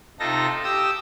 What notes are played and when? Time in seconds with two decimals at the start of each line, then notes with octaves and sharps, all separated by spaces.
0.20 C3 D#4 F4 A4 A#6
0.64 G4 G5 D#6 E6